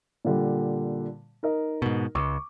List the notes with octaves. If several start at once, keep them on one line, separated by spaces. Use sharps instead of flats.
A#2 D3 G3
D#4 A#4 D#5
G#2 B2
C#2 C#6 D6